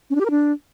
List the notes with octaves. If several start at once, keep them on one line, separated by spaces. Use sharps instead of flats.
C#4
D4
G4
A#4
D4